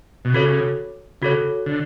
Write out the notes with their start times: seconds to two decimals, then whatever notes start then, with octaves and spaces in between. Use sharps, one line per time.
0.25 B2
0.34 C#3 F#4 A4 C#5
1.22 C#3 F#4 A4 C#5
1.66 D3